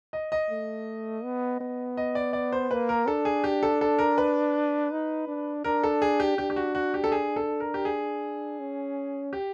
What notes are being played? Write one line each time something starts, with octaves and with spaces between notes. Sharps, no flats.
D#5
D#5
A3
B3
B3
D#5
D5
D5
C5
A#3 B4
A#4
D4 A4
G#4
G4
A4
A4
A#4
B4
D#4
D4
D4 A#4
A4
G#4
G4
D4 G4
G4
F#4
F#4
G4
A4
G#4
A4
A#4
G4
G#4
C#4
G4